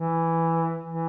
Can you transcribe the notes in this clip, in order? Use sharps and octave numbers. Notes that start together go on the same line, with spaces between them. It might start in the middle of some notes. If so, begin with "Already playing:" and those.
Already playing: E3
E3